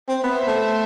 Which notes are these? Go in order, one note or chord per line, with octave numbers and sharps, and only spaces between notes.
C4
B3 C5 E5
A3